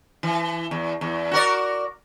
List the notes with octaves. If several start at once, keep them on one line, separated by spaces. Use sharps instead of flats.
E3
E2
E2
F#4 A#4 D5